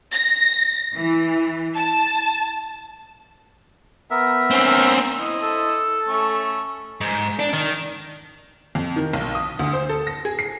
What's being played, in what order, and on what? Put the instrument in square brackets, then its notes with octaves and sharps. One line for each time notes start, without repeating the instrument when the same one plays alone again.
[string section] A#6
E3
A5
[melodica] B3 A#4 E5
[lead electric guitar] C4 C#4
[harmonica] E4 C5 D#5
[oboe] A4
[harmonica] A3 C#4 C#6
[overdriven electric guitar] G#2
D4
D#3
[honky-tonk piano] F2
D#3
B1
D#6
D2
C5
A4
A#6
G#4
C7